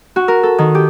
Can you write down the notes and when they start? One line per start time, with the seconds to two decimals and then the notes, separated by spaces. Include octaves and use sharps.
0.16 F#4
0.28 A#4
0.43 A4
0.58 D#3
0.75 G4